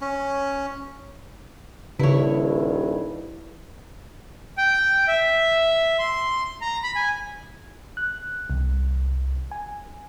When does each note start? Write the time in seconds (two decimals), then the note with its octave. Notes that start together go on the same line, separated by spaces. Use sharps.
0.01 C#4
1.99 D#1 G2 C#3 E4 C#5
4.58 G5
5.08 E5
5.99 C6
6.62 A#5
6.83 B5
6.95 G#5
7.97 F#6
8.50 C2
9.51 G#5